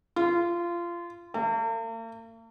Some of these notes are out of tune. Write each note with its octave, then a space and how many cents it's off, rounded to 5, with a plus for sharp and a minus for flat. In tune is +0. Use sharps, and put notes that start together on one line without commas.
F4 -20
A#3 -45